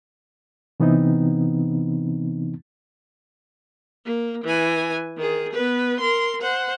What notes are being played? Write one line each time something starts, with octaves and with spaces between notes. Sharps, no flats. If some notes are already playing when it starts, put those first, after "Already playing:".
C3 E3 B3 C4 D#4
A#3
E3 G#5
D#3 G#4
B3 B4
A#4 C6
C5 F#5